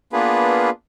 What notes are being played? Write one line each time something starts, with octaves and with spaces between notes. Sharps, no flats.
A#3 B3 D4 F4 G#4 B4